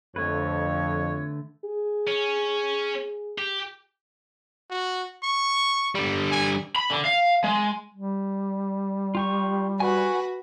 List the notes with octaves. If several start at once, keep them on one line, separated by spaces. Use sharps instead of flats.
F2 D3 A3 B4 C#5
G#4
C#4
G4
F#4
C#6
D3 G3
G#5
B5
D3
F5
G#3
G3
F4 G4 C#6
F#4 B4 G#5 C#6 F#6